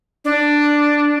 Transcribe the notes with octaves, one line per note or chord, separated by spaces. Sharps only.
D4